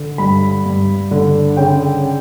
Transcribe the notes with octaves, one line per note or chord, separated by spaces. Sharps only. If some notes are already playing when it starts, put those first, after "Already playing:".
Already playing: D3
G2 B5
G2
D3
C#3 G5